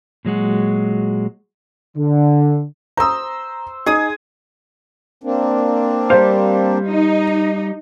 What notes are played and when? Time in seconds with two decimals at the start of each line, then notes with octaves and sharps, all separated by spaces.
0.25 A#2 F#3 G#3 F#4
1.96 D3
2.97 C5 A#5 C6 D#6 E6
3.86 D#4 G#4 D#6
5.24 A#3 C4 D4
6.10 G3 C5 F5
6.87 D#4